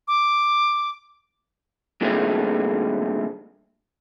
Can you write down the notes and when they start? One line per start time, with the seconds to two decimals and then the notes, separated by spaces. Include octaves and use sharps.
0.08 D6
2.01 G2 A#2 D#3 G#3 A3 C4